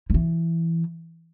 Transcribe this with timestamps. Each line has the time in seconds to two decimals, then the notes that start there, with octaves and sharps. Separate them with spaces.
0.10 D3
0.14 E3